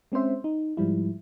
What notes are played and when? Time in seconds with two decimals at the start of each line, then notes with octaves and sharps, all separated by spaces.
0.12 G#3 C4 C#4 C5 E5
0.44 D#4
0.77 G#2 F3 G3 E4